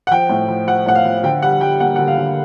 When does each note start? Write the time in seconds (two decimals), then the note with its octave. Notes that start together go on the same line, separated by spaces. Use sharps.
0.07 F#5
0.11 F3 G5
0.29 A2
0.48 F3
0.67 F3 F#5
0.86 A2 F#5
0.95 F5
1.05 F3
1.23 D3 G5
1.42 G3 F#5
1.61 G3 G5
1.80 A#3 F#5
1.96 D3 F#5
2.08 F5
2.18 D3